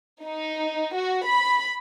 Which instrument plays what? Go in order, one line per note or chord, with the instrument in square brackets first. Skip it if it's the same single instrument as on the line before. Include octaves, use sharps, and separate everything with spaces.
[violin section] D#4
F#4
B5